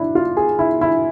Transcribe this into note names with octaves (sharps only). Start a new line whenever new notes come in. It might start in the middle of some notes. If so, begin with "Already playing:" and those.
Already playing: D4 E4
F4
G#4
E4
E4